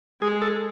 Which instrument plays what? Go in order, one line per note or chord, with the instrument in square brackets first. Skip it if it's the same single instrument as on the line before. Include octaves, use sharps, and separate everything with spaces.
[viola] G#3 [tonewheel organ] G#4
[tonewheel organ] A4